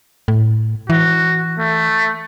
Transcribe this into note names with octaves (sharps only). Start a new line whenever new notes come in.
A2
E3 F#4
A3